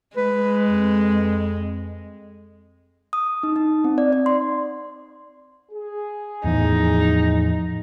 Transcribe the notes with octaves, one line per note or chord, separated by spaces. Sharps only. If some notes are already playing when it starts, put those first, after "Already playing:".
G#3 B4
F2
D#6
D#4
D#4
C4
D5
D5
C6
G#4
E2 A2 F3 D#4